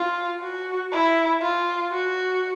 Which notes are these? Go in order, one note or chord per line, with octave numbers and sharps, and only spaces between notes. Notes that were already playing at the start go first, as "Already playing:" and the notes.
Already playing: F4
F#4
E4
F4
F#4